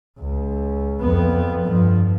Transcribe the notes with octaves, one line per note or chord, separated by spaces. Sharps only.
C#2
F2 B3
G2 F3